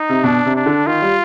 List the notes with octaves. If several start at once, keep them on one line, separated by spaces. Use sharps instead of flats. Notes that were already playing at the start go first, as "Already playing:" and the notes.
Already playing: D#4
C3
B2 D4
C3
D4
D3
D#3 F4
G3